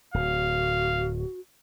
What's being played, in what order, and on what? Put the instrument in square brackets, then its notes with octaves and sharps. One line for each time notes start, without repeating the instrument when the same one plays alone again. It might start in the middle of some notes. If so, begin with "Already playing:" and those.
[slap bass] D1 [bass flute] F#4 [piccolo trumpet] F5